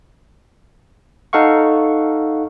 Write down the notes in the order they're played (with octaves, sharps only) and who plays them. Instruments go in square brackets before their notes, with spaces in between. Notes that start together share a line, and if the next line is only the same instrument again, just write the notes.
[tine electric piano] D#4 A4 F5 F#5 C#6